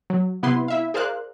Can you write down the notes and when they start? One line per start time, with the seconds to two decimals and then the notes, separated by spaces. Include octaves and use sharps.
0.10 F#3
0.43 C3 B3 E4 B4 C6
0.68 E4 E5 F5
0.94 G#4 A#4 C5 D5 F5 F#6